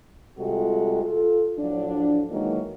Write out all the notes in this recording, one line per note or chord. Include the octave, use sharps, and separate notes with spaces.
C3 G3 G#3 F4 F#4 A4
F4 A4
A2 F3 F#3 D4
D#3 E3 F#3 G#3 A#3 D#4